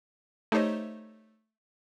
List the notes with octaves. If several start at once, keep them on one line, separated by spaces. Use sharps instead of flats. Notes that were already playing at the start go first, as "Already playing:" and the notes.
A3 D#4 G4 C5 C#5 D#5